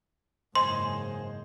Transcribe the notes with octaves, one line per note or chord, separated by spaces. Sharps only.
F#1 G#2 C5 D#5 G#5 C6